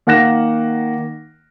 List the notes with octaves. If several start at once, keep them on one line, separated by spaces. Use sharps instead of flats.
D#3 A#3 F#5 F#6 A#6 E7